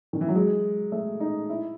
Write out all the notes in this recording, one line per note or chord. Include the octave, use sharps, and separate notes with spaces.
D#3
E3
F#3
G#3
A3
D#4
E4